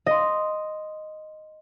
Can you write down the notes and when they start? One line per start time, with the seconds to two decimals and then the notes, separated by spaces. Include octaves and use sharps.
0.06 D#5 C6